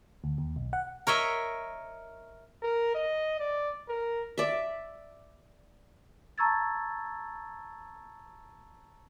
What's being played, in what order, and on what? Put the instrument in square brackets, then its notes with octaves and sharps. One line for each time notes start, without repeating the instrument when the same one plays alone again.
[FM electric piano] D2
D#2
B1
F#5
[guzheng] A#4 C#5 D#5 E5
[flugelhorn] A#4
D#5
D5
A#4
[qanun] D5 E5
[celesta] A5 A#5 C#6 E6 G#6 A6